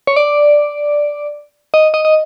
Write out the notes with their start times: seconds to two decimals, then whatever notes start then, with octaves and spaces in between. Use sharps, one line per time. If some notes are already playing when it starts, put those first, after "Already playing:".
0.07 C#5
0.16 D5
1.74 D#5
1.94 D#5
2.05 D#5